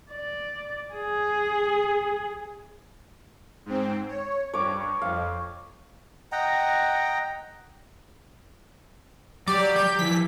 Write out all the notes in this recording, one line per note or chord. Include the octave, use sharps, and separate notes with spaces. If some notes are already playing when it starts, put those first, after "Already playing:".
D5
G#4
G#2 C4
C#5
G2 C#5 D6
F2 F5
D#5 F#5 G5 A#5
F#3 G4 D5
D5 A#5 G6
F3 E4 B6